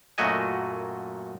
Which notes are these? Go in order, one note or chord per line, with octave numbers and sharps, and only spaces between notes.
F#2 A#2 A3 F#4 D#5 G#5